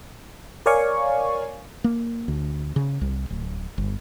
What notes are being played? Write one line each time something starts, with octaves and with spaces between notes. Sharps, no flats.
A#4 C#5 D5 F5 G#5 C#6
A#3
D2
C#3
C2
D1
G1